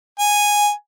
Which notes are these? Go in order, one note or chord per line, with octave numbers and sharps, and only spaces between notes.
G#5